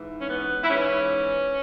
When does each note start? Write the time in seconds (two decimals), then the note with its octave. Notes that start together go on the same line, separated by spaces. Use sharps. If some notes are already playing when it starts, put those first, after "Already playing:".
Already playing: G#2 E3
0.22 C#4
0.30 B3
0.64 E4
0.69 G#2 E3 C#4